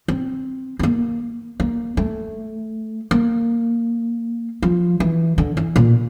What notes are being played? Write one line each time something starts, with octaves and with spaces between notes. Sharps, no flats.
C4
C4
A#3
A#3
A3
A#3
F3
E3
D3
E3
A#2